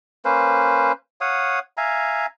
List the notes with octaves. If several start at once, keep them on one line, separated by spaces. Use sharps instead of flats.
A#3 C#4 B4 C5
C#5 F5 F#5 D#6
E5 F5 G#5 A#5